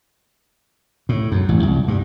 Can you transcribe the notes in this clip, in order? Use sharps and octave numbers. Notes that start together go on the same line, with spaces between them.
A2
F#2
A1
C2
G2